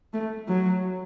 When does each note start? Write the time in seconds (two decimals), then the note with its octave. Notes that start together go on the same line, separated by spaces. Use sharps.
0.14 A3
0.48 F#3